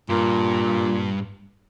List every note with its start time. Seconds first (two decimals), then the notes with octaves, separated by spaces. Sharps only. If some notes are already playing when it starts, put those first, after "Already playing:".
0.09 G2 A#2